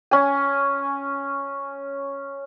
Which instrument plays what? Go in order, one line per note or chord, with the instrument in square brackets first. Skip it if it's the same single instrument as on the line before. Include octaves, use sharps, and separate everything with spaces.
[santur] C#4 G#5